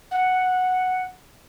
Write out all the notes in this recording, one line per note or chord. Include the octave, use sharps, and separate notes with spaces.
F#5